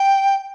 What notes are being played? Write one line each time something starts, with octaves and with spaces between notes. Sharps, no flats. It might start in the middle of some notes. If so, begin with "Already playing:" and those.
Already playing: G5